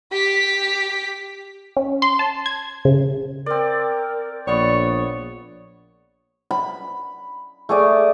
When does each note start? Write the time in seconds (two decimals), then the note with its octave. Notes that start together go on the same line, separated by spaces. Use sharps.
0.12 G4 B6
1.77 C#4
2.02 C6
2.19 A5
2.46 G#6
2.85 C#3
3.46 C4 A#4 D5
4.47 A#1 B3 C#5 D5 C#6
6.51 B5
7.69 A3 G#4 D5